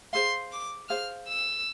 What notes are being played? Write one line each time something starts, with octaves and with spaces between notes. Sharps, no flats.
G#4 C5 F5 C6
D6
G#4 C5 F5 F6
E6